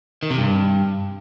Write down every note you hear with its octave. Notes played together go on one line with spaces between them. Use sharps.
D#3
C3
G2